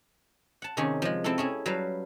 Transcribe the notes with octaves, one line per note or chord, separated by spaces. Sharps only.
F#5 A5
C3 D#3 A#3 C#4 G#4
F3 G#3
C4 E4 F4 A4
C#4 E4 G#4
F#3 G3 B4 F5 A5